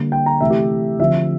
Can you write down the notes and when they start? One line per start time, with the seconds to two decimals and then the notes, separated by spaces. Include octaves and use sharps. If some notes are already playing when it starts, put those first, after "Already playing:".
Already playing: D3 G3 A#3
0.12 G5
0.26 A#5
0.40 C3 E3 A3 E5
0.50 G4
1.00 D3 F3 C4 E5